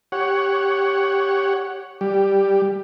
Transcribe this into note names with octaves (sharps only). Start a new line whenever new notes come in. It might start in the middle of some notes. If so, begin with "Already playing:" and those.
G4 C#5 F#5
G3 G4